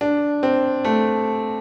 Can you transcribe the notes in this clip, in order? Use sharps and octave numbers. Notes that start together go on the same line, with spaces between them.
D4
C4
A3